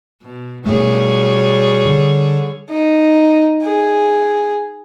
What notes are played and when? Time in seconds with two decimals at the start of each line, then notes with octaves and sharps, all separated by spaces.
0.22 B2
0.66 B2 G3 A3 G#4 C#5
1.86 D3
2.70 D#4
3.62 G#4